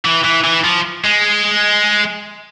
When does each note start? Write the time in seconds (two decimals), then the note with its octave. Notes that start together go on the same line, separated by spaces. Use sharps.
0.05 E3
0.24 E3
0.44 E3
0.64 F3
1.04 G#3